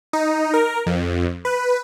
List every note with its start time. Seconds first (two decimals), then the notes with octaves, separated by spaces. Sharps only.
0.13 D#4
0.54 A#4
0.86 F2
1.45 B4